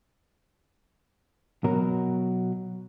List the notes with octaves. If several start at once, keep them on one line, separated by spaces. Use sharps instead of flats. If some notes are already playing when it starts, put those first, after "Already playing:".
B2 F#3 A#4